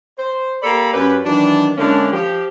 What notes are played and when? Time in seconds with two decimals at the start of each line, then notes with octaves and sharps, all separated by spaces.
0.19 C5
0.63 A#3 G4 A4 D5 A#5 B5
0.93 F#2 C#4 G4 B4
1.25 D#3 E3 F#3 D4
1.78 D3 G#3 A#3 C#4 D4 E4
2.12 F3 G4